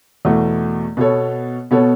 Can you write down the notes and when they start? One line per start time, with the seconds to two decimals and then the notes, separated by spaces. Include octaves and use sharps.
0.25 E2 B2 A3 F#4
0.97 B2 B3 A4 C#5
1.71 B2 B3 A4 C#5